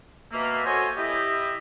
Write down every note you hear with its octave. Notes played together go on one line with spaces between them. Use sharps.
B2 A#3 E5
F#4 A4 C5 C#5 D#5 G#5
E4 G4 D#5